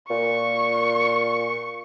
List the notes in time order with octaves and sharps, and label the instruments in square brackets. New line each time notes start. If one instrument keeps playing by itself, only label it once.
[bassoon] A#2 [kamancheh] C#6